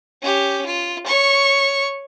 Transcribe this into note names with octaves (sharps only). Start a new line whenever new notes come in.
C#4 G4
F4
C#5 C#6